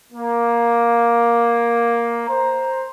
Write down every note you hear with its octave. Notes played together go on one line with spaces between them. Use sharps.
A#3
C5 A#5